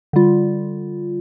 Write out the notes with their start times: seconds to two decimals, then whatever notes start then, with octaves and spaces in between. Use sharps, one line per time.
0.13 D3 G3 F4